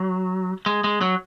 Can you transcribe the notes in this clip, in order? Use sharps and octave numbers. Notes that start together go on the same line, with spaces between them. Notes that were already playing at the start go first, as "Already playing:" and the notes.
Already playing: F#3
G#3
G#3
F#3